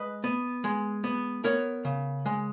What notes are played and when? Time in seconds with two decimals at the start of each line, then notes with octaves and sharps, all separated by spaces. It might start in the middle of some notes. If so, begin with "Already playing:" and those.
Already playing: G#3 B4 D#5
0.24 B3
0.64 G#3
1.04 B3
1.44 B3 A#4 C#5
1.85 C#3
2.26 G#3